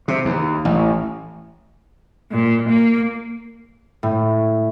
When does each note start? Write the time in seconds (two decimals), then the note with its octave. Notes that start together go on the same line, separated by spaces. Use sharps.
0.08 C3
0.25 D#2
0.65 A1
2.32 A#2
2.68 A#3
4.03 A2